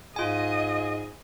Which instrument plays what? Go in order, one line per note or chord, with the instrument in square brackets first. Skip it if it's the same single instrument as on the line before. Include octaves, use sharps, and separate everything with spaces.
[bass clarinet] G#2 [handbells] F4 G#5 [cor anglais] G#4 [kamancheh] D#5